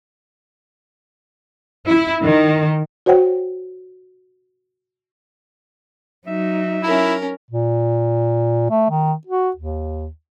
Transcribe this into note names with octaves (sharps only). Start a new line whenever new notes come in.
E4
D#3
F#4 C5 C#5 F#5 G5
F#3 D#4 E5
C#4 E4 A#4
A#2
A3
D#3
F#4
D#2